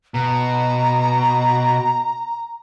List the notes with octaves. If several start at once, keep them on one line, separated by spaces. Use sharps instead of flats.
B2 A#5